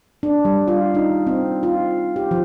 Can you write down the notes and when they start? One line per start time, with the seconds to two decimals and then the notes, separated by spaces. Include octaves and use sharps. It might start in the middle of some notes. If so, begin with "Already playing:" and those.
0.23 D4
0.45 G3
0.68 F4
0.95 D#4
1.27 C4
1.63 F4
2.16 G4
2.31 F3